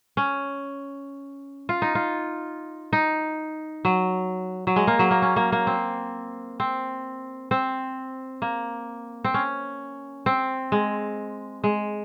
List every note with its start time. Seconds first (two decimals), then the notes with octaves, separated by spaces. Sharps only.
0.17 C#4
1.69 F4
1.82 D#4
1.95 F4
2.93 D#4
3.85 F#3
4.67 F#3
4.76 G#3
4.87 A#3
4.99 F#3
5.11 A#3
5.22 C#4
5.36 A#3
5.52 A#3
5.67 C4
6.60 C4
7.51 C4
8.42 A#3
9.24 C4
9.34 C#4
10.26 C4
10.72 G#3
11.64 G#3